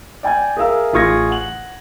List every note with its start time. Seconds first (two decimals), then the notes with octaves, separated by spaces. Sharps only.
0.23 D5 G5 G#5 G#6
0.57 G#4 A#4 E5 F5 E6
0.93 A1 F4 G#4 C#6 G#6 A#6
1.31 F#5 F#7